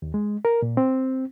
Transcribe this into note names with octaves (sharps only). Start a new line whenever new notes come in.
D#2
G#3
A#4
A#2
C4